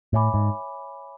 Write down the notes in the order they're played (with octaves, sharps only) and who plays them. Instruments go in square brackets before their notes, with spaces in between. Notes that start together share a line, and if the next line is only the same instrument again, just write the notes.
[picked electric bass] A2 [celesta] C#5 E5 G#5 B5 D6
[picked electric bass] G#2